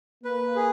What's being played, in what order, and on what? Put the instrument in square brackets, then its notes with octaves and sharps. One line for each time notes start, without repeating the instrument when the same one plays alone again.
[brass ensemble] A#3 [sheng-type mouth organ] B4
[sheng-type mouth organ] G#4